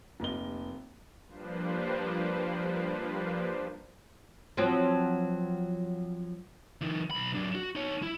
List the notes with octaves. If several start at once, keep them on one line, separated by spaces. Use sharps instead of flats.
F1 A#3 D#5 G7
F3 G3 A#3 D4 B4 C5
F3 F#3 C4
E3 D#4
B1 B5
F#3 D4
F#4
D#4 C#5
E4